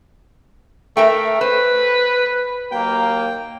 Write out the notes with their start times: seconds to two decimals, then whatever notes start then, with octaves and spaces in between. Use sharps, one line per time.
0.97 A3 A#4 E5 G5
1.41 B4 C5
2.71 D#2 F#3 A#3 G5